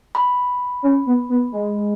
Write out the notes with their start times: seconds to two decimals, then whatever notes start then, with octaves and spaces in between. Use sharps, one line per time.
0.15 B5
0.83 C#4
1.06 B3
1.29 B3
1.52 G#3